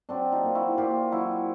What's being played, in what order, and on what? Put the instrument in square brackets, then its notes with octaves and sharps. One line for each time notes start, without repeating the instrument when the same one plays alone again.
[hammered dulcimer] F#3 C4 D4
D#4 F4
A#2
E4 F#4
A#2 F4 G4
F#3 E4 F#4